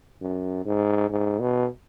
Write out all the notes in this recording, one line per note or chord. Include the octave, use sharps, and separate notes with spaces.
F#2
G#2
G#2
B2